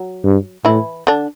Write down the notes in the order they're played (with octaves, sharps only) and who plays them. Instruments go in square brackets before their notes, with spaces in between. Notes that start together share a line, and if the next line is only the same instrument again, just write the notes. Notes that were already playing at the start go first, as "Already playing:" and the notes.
Already playing: [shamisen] F#3
[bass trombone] G2
[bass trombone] A2 [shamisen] E3 E4
[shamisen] D3 D4